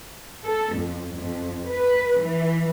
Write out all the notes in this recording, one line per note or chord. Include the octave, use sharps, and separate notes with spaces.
A4
F2
F2
B4
E3